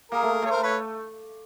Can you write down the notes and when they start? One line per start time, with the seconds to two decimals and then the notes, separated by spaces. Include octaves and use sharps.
0.12 A#3 G#4 A#4
0.23 A3
0.42 A3 C#5
0.50 A#4 C5
0.63 B4 C#5